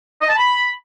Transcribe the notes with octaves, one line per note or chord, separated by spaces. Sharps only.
D#5
A5
B5